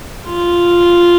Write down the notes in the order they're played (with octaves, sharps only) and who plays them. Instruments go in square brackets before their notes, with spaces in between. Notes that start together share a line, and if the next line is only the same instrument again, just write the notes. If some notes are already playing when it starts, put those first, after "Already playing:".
[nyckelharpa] F4